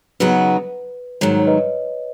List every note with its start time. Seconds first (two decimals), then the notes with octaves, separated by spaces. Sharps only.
0.20 C#3 F#3 B3 D#4 F#4 B4
1.21 G#2 D#3 F#3 C#5
1.39 C#5
1.47 B4 D#5